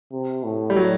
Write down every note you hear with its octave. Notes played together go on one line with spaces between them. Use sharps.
C3
A2
G3
F#3